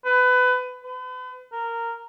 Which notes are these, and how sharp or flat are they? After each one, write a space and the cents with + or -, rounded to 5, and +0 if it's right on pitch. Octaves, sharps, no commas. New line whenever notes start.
B4 +25
B4 +40
A#4 -10